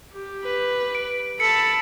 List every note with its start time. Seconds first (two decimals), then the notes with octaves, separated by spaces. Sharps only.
0.13 G4
0.44 B4
0.95 D7
1.40 A4 A5 B5 C#7